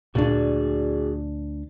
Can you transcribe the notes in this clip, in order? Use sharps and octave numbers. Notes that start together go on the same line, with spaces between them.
D2 A#2 D4 F#4 G#4 D5